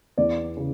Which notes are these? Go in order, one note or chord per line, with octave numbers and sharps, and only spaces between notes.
E2 D5
C#3